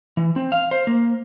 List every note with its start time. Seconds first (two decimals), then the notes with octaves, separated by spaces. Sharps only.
0.17 E3
0.36 C4
0.52 F5
0.71 C5
0.87 A#3